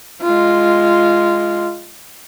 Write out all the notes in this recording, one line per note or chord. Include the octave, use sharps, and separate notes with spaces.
G#3 F4